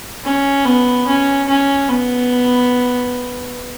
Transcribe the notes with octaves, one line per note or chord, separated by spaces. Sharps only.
C#4
B3
C#4
C#4
B3